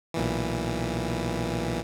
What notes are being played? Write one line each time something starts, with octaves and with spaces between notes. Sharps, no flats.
B1 A#2 E3